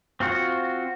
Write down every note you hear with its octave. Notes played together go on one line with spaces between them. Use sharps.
C4 F4 F#4 F#5